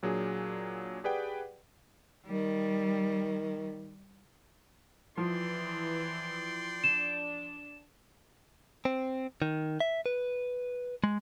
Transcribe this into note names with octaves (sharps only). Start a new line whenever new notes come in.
A#2 F#3 D4 G#4
G4 G#4 B4 D5 F#5 G5
D#3 G3
E3 F3 D5 G5 C6
D4 E7
C4
D#3
E5
B4
G#3